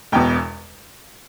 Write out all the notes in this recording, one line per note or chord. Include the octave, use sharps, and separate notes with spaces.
E1 E2 B2 G5